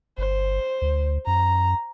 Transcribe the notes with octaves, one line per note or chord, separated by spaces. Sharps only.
G1 C5
D2
F#2 A#5